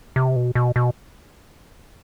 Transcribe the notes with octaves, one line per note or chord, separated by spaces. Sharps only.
C3
B2
B2
B2